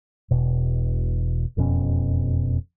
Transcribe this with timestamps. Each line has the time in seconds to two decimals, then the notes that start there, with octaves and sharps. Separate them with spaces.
0.31 E1 B2
1.57 E1 F2 B2 C#4